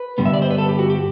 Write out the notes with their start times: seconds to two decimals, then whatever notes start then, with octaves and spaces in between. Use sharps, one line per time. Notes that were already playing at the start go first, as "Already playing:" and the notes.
Already playing: B4
0.18 G2 D3 G3 B3
0.25 E5
0.34 D5
0.42 C5
0.51 B4
0.58 A4
0.69 G4
0.79 F#4
0.90 G4